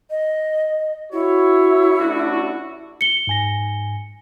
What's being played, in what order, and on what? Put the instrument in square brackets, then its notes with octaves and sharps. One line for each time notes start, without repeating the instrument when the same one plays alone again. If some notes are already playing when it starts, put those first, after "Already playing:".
[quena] D#5
[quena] E4 [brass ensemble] F#4 C#5
[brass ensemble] A1 D4 F#4
[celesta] C#7 G7
[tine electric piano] G#2 G#5 A#6